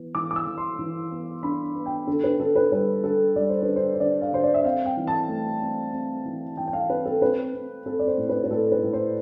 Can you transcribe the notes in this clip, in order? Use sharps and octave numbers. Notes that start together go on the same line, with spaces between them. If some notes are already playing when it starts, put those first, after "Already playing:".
Already playing: E3 B3
E3 D6
D6
E6
E3
C6
E3
B3
D4 B5
B3
G5
D3 A4
B4
D3 A4
B4
G3 B4
D3 A4
G3 D5
C5
B4
D3
C5
C5
D3 D5
F5
D3 C5
D5
E5
C4 F5
G5
E3
A5
A3
C4
C4
E3
E3 G5
G5
F5
C4 B4
A4
C4 B4
C4
C4 A4
D5
C5
A2
B4
B4
A2 A4
B4
A2
C5